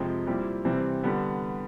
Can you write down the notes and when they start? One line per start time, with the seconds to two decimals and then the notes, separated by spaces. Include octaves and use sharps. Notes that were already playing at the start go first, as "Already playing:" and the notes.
Already playing: F2 C3 F3 G#3 C4
0.26 A#2 G3 C4 E4
0.65 C3 E3 G3 C4
1.04 D3 G3 B3